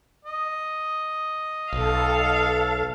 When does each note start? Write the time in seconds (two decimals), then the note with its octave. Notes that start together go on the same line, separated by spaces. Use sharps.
0.25 D#5
1.73 B1 A4 F5